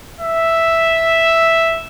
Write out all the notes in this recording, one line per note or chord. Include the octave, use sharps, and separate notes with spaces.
E5